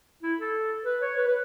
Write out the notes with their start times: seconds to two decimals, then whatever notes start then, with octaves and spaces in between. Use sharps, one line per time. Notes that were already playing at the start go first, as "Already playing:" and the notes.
0.23 E4
0.39 A4
0.85 B4
1.02 C#5
1.17 B4
1.27 B4